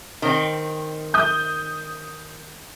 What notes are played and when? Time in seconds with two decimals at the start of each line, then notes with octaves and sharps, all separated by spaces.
0.22 D#3 C4
1.14 D#6 G6